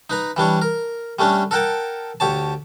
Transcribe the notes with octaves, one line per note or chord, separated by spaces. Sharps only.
D#4 B4 A#5
E3 G3 D4 C#5
A#4
G3 A3 C#4 D4
A4 A#4 F#5 G5 A5
D2 G4 C#5 A5